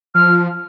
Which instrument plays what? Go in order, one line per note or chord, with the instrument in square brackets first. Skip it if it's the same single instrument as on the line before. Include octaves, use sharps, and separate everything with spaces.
[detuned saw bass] F3 [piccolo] F6